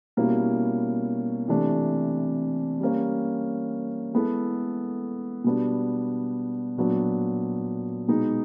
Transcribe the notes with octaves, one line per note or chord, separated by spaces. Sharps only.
B2 G3 A#3 C#4 E4
C3 E3 A3 D4
G3 A#3 C#4
G#3 B3 E4 A4
B2 G3 B3 D4
A#2 F#3 B3 D4
B2 G#3 B3 D#4